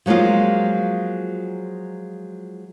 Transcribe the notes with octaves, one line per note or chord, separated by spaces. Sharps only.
F3 F#3 G#3 A#3 F4